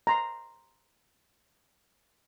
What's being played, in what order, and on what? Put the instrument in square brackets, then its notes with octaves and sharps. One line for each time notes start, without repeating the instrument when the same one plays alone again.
[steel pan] A#5 C6